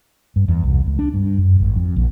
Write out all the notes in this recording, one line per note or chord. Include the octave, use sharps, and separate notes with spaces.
G2
E2
C2
C#2
D4
G2
F#2
G#1
F2
A#1